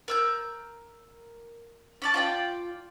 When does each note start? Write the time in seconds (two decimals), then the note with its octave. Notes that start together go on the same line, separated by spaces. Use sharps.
0.08 A#4 E6 G6
2.02 C#4 D5 A5
2.14 F4 D5 G5